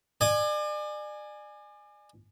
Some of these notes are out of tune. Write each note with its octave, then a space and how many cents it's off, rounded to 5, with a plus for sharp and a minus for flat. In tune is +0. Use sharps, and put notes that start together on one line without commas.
D5 +35 G#5 +0